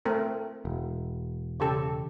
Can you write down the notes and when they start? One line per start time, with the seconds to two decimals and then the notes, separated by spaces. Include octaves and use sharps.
0.05 A3 C4 A#4
0.65 E1
1.60 C#3 G4 A4